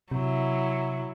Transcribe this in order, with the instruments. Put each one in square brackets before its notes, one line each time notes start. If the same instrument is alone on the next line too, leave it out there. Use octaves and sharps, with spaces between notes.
[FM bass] C3 [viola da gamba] F#3 E4